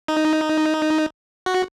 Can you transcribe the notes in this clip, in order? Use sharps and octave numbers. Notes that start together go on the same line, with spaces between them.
D#4
F#4